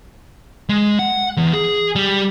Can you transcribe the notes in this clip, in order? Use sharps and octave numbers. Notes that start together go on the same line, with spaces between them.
G#3
F#5
E2
G#4
G3